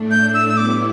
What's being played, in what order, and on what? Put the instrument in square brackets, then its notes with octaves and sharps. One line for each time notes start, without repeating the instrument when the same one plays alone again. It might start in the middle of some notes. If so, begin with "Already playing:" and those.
Already playing: [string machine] A2 A3 D4
[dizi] G6
E6
E6
[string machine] A2 G3 B3 E4 [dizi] D6